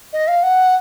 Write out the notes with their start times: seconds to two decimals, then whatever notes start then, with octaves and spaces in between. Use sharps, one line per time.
0.13 D#5
0.28 F5
0.43 F#5